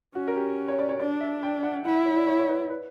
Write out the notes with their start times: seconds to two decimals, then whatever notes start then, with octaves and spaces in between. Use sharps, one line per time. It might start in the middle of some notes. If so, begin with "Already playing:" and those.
0.15 C#4 F#4
0.27 A#4
0.36 G4
0.68 C#5
0.79 D5
0.89 C#5
1.00 D4 D5
1.20 E5
1.43 G5
1.63 F#5
1.85 E4 F#5
1.95 E5
2.06 C#5
2.16 D5
2.27 C#5
2.39 C#5
2.49 B4
2.69 B4